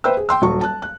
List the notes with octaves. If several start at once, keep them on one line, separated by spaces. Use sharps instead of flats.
B4 C5 E5 G5 E6
G#4
G5 C6 E6
D#1 F#3 C#6
A5 F#6
F#6